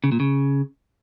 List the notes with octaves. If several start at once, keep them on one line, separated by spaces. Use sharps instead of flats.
C#3
A#2
C#3